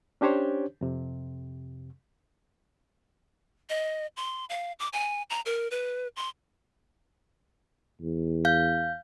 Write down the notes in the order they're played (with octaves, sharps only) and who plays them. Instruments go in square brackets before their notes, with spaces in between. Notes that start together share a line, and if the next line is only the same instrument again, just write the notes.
[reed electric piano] C#4 D4 G4 C5 C#5
F2 C3
[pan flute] D#5
C6
F5
D6
G#5
A#5
A#4
B4
C6
[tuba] E2
[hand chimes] F5 G6